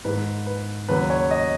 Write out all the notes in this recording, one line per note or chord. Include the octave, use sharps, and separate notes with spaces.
G#2 D#3 G#3 B4
B4
D#2 C#3 F#3 B4
C#5
D#5